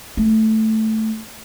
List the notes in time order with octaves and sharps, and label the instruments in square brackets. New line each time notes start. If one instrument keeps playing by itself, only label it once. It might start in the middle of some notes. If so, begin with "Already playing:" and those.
[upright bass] A3